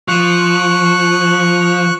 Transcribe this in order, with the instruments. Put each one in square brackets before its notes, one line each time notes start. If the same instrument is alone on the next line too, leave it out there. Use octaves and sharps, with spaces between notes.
[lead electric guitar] F3 [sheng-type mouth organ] C#6 F#6